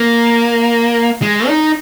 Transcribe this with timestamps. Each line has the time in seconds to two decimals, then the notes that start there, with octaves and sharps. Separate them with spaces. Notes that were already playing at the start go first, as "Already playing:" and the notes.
Already playing: A#3
1.22 G#3
1.48 D#4